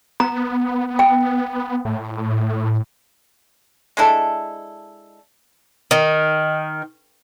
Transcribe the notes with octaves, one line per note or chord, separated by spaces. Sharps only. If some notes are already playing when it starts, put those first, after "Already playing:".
B3 A#5
G5
A2
G#3 D4 E4 A4
D#3